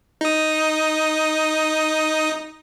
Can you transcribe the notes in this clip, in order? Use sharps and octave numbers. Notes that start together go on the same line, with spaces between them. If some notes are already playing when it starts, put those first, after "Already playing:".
D#4 D#6